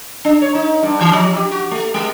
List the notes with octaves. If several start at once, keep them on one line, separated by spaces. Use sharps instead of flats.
D4
C#5
D#4
G2
E3
F3
G4
F#4
A3
G#3